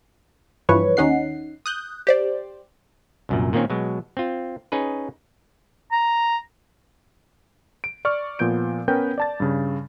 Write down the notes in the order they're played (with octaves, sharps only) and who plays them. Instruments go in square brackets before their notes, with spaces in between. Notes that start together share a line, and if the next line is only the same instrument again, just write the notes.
[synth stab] G2 E3 F3 B4 C#5 C#6
D#2 C#4 D#4 F#5 C7
D#6 F#6 G6
G4 C5 D5
[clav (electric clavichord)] C2 F#2 A#2
A#2 D#3 A#3 C4 C#4
B2 F#3 G#3
C4 F4
C#4 D#4 G#4 B4
[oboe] A#5
[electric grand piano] D7
D5 C#6 F6
A#2 F3 B3 G6 D7
B3 C#4 A#4 B4 G5 G6
D5 A5 A6
G2 C#3